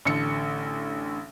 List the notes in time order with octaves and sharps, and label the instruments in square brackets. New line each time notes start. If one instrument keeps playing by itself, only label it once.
[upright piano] A1 D3 A4 C#7